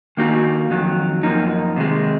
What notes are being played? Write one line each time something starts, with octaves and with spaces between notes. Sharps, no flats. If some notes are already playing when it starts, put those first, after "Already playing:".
D#3 A#3 D#4 F#4
F2 D#3 F#3
F#2 F3 A#3 D#4
C3 D#3 G#3